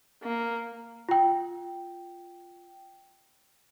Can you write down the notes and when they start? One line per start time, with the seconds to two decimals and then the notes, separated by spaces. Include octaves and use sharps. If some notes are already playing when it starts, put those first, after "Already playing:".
0.23 A#3
1.09 F4 G5